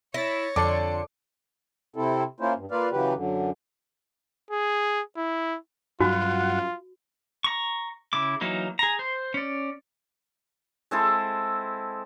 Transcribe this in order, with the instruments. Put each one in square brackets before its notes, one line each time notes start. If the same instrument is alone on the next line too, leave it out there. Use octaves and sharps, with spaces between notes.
[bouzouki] E4 [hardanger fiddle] C#5 [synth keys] A6 A#6
[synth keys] F2 C6 C#7 [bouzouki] D3 [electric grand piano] D5 A5 D6
[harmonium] C3 C4 E4 A4
A#3 C#4 E4 F4 C5
G2
A#3 F4 B4 D5 F5
C#3 E3 F#3 G4 B4
F#2 D3
[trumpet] G#4
E4
[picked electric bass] G2 F#3 [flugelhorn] F4 [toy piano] F#4 [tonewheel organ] F#5
[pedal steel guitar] A#5 C#6
C#3 E4 D6
E3 F#3 A#3 D#4
G#4 A#5
C5
C#4 D5
[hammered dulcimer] G#3 C4 E4 A4